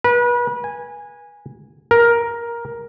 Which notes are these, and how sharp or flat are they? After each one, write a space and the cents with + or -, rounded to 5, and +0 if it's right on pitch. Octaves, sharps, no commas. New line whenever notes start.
B4 -35
G#5 -10
A#4 +10